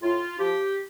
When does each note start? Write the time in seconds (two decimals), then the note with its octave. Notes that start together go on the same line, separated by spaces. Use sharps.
0.02 A2 F4
0.39 F3 G4